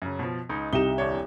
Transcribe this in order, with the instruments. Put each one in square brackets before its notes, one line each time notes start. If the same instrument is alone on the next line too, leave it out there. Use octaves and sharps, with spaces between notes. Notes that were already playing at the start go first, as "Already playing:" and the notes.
[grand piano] F#2 C#3
B2 F3
C#2 D#4
[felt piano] C2 G4 E7 [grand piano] D#4 G7
[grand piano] D#1 D4 C#5